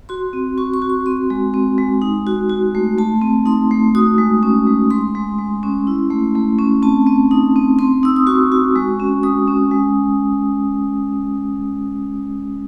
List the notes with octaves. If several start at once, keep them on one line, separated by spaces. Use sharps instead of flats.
F#4 C6
C4
F#4 C#6
C#6
F#4
C#6
C4 C6
G#3
C4
G#3
D#4
F#4
F#4
A3
A3 A5
C4
D#4 C6
A3
F#4 D#6
G#3
C#4
G#3
G#3 C6
G#3
G#3
C#4
E4
A3
A3
C#4
C4 A5
C4
D#4
C4
C4 C6
D#4 E6
D#6
F#4 C#6
F#4
G#3
C#4
G#3 D#6
C#4
G#3